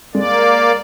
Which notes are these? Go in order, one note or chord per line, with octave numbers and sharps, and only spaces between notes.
G#3 A#3 D5